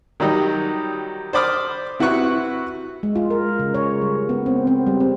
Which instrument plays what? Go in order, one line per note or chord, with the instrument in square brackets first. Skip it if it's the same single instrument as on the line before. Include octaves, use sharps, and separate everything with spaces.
[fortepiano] D#3 F#3 G3 D#4
C5 D5 B5 D6 D#6 F6
C3 E4 F#4 B4 C#6 F#6
[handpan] G#3
F4
A#4
C#3
C#5
G3
B3
C4
C4
G3
C4